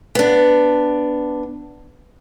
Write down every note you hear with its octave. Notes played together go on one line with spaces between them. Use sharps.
B3 D4